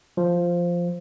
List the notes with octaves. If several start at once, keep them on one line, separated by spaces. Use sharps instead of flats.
F3